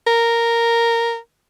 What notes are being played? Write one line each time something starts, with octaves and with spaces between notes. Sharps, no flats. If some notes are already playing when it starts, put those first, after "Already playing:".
A#4